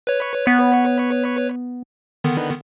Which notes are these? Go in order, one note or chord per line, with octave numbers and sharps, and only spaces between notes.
B4 C#5
B3
D3 D#3 B3